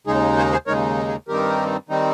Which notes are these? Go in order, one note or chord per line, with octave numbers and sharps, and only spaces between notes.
D#2 C#3 G#3 D#4 G#4
G#4 C5
G#4 C5
D#2 C#3 G#3 D#4 A#4 C#5
G#4
G2 D#3 G3 C4 D#4 G4 A#4
D#3 G3 C4 D#4